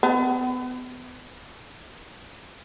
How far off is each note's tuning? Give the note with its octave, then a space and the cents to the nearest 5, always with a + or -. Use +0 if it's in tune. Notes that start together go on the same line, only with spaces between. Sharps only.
B3 +30